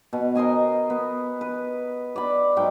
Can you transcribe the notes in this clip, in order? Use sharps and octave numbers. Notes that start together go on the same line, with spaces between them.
B2
A#4 C5 D#5 G#5
B3
B4
D5 B5
G#2 F#3 G5 D6